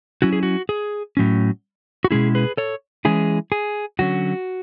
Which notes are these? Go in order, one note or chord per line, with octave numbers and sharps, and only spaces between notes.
F#3 C#4 E4 F#4
G#4
F#4
G#4
A2 F#3 C#4
F#4
B2 G#3 C#4 E4 G#4
G#4 B4
A4 C#5
E3 G#3 C#4 E4 G#4
G#4
D3 F#3 C#4 F#4